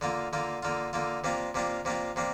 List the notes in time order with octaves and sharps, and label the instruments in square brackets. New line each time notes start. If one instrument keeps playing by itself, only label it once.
[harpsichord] D3 A#3 F4
D3 A#3 F4
D3 A#3 F4
D3 A#3 F4
C3 A#3 D4 F4
C3 A#3 D4 F4
C3 A#3 D4 F4
C3 A#3 D4